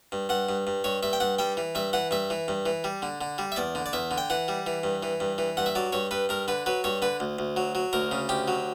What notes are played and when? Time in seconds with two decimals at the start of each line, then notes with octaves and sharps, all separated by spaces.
0.12 G2
0.29 G2 F#5
0.49 G2
0.67 G2
0.84 G2 C#5
1.03 G2 E5
1.13 G5
1.20 G2 F#5
1.39 G3 G5
1.57 E3
1.75 G2 E5
1.93 E3 F#5
2.11 G2 E5
2.30 E3
2.48 G2
2.66 E3
2.84 G3
3.02 D3
3.21 D3
3.38 G3
3.52 E5
3.56 E2 D5
3.75 D3
3.86 D5
3.93 E2 E5
4.11 D3
4.18 G5
4.30 E3 F#5
4.48 G3
4.67 E3
4.84 G2
5.03 E3
5.20 G2
5.38 E3
5.57 G2 F#5
5.66 E5
5.75 F#3 D5
5.93 G2 C#5
6.11 G2 B4
6.29 G2 A#4
6.48 D3 B4
6.66 F#3 B4
6.84 G2 C#5
7.02 D3 B4
7.20 D2
7.39 D2
7.57 F#3
7.75 F#3
7.93 D2 A#4
8.12 C#3
8.29 D2 G4
8.48 F#3